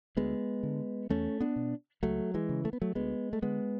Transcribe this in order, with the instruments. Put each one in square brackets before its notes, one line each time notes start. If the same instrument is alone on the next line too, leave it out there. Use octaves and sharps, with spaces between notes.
[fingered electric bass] D2 G#3 B3
D3
E2 A3 C#4
B3 D4
B2
C#2 F#3 A3
E3 G#3
C#3
A3
B3
F#3 A3
D2 G#3 B3
A3
D3 G#3 B3